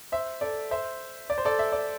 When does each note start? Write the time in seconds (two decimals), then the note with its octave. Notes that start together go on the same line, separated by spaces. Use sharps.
0.12 C5 E5
0.41 A4 D5
0.71 C5 E5
1.30 D5
1.38 C5
1.45 A4 D5
1.59 E5
1.72 D5